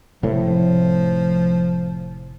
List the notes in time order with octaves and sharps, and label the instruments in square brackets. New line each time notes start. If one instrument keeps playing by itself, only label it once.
[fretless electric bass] F1 A2 [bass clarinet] F3